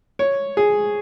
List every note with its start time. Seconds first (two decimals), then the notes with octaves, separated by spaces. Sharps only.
0.19 C#5
0.57 G#4